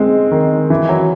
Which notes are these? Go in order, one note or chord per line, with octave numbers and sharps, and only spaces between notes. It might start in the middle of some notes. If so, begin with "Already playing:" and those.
Already playing: G#3 C4
D#3
E3
F#3